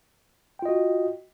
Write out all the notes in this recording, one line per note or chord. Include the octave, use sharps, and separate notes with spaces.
F4 F#4 D#5 G5